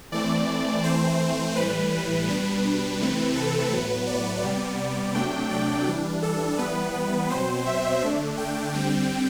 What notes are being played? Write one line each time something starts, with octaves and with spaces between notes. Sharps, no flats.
E3 A3 C4 D5
E3 A3 C4 C5
A2 E3 G3 B4
B2 G3 D4 B4
C3 E3 A3 C4
A4
A2 F#3 B3 B4
D5
C3 G3 B3
C3 F#3 A3 D4 G5
D5
E3 G3 D4
A4
E3 G3 B3 B4
B4
B2 F#3 C4 C5
E5
D3 A3 D4
G5
D3 G3 C4